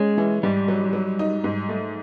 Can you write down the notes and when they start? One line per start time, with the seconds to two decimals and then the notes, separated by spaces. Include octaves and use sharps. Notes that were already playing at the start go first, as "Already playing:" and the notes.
Already playing: G#3 C#4
0.17 E3
0.43 G#2 G3
0.68 F#3
0.93 F#3
1.19 D#4
1.44 G#2
1.69 A3